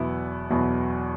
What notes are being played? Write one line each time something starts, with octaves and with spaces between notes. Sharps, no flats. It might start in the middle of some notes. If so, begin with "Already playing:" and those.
Already playing: E2 B2 F#3 B3 E4
E2 B2 F#3 B3 E4